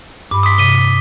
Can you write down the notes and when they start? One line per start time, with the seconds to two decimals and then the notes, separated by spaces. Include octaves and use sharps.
0.31 G2 B5 D6
0.43 C6 D#6 B6
0.58 C3 B6 D#7 G7